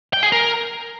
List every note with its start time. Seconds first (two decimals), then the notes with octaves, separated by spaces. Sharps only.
0.14 G5
0.23 G#4
0.32 A#4